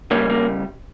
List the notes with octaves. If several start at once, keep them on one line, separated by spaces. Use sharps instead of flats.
C#3 E3 G3 A#3 C#4
A#3